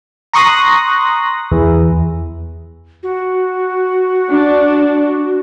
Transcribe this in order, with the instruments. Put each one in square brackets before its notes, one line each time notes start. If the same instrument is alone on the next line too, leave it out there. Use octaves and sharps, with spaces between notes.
[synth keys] A#5 C6 C#6 D#6 F#6 A#6
E2
[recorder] F#4
[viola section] D4